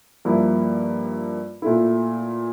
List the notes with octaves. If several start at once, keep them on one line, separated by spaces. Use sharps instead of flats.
G2 F3 A#3 E4
A#2 A3 E4